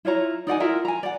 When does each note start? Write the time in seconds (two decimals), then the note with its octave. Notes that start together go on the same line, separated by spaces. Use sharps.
0.05 E4 F4 C#5 A#5
0.47 D#4 D5 F#5 G#5
0.60 E4 F4 A#4 E5
0.85 G#5 A#5
1.03 D5 F#5